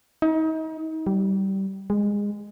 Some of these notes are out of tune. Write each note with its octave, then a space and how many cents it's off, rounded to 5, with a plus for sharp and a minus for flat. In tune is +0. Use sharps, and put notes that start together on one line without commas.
D#4 +35
G3 -20
G#3 -20